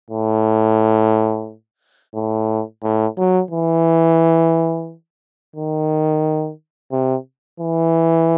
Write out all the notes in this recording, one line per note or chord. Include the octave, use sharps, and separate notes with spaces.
A2
A2
A2
F#3
E3
D#3
C3
E3